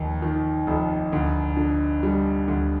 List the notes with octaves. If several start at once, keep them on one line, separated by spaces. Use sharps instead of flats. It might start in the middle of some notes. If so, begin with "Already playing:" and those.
Already playing: F1 D#2
D#3
F1
D2
D3
G3
D2